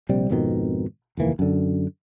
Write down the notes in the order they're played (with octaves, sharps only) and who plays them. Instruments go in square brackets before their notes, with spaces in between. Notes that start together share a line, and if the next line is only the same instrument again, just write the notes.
[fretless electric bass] A#1 C3 G3
G#1 F2 B2 D#3
F1 D#2 E3 A#3
F#2 D3